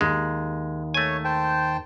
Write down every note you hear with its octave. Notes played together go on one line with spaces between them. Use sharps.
D#2 G#3
A3 C#5 G#5
C5 G5 A5